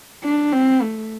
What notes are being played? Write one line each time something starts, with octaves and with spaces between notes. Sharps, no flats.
D4
C4
A3